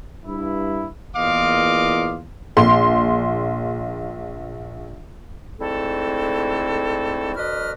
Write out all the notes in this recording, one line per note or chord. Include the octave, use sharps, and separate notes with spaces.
G2 E4
E2 A#2 F4 D#5 F5 D6
A#1 C6
G#2 D3 A3 C4 E4 A4
D2 D4 F#4 B4 D#5 F6